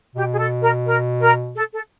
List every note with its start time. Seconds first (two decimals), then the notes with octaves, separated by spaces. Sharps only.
0.16 B2 G4
0.33 G#4
0.39 A4
0.62 A#4
0.86 A#4
1.21 A#4
1.56 A4
1.74 A4